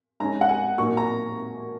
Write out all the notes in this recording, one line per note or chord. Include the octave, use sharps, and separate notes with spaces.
G#2 G#3 C#4 A#5
F#5
G#5
A#2 F#3 A#3 D#4 C#6
A#5